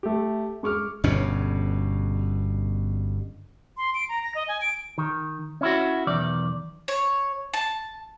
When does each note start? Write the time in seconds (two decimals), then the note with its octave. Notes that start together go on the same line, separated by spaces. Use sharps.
0.03 A3 G4
0.63 G#3 C#6 D6 F6
1.04 G1 G2 B2 C#4
3.77 C6
3.94 D7
4.09 A#5
4.23 A#6
4.35 D#5
4.48 G#5
4.61 D7
4.98 D#3
5.61 C#4 E4 F#4
6.07 B1 E2 D#3 D5
6.88 C#5
7.54 A5